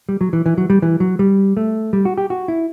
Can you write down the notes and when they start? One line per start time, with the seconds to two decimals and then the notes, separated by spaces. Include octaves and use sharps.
0.09 G3
0.21 F#3
0.33 E3
0.46 E3
0.58 F#3
0.70 G3
0.82 E3
1.00 F#3
1.19 G3
1.57 A3
1.93 G3
2.05 F#4
2.18 G4
2.30 F#4
2.48 E4